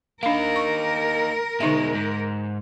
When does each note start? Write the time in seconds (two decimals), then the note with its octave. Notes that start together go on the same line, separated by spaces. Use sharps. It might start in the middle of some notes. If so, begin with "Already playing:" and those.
0.23 A#3 D4 D#4 A#4 F5
0.56 C#6
1.61 B2 D3 G#3 D#4 E5
1.95 G#2